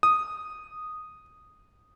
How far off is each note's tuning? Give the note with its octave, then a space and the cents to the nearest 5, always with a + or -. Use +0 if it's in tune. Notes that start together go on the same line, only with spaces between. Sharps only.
D#6 -5